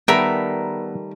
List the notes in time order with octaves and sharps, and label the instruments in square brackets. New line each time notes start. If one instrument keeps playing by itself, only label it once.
[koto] D#3 G3 A3 [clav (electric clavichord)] B3 E5 A#5 [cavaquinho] A#4 B5